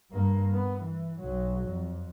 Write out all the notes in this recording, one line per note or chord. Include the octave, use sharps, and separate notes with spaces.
G2 A#3
B3
E3
B1 F#3
F2